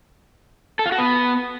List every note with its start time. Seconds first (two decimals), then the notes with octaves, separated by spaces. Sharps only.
0.79 A4
0.86 F4
0.92 F#4
0.98 B3